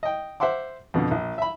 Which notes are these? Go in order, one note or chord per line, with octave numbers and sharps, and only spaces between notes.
D#5 G5
C5 E5 F#5 C6 D6
F2 B2 D3
A#1
E5 B5